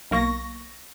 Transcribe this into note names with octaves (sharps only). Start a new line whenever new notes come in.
B1 A#3 C#6 A#6